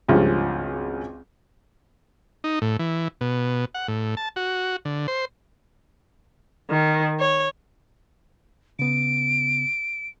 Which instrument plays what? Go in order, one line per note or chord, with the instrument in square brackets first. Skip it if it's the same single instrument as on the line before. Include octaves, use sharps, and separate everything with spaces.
[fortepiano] G#1 C#2 G2 F3
[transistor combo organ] D#4
A2
E3
B2
F#5
A2
A5
F#4
D3
C5
[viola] D#3
C#5
[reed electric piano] C#3 B3 [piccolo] D7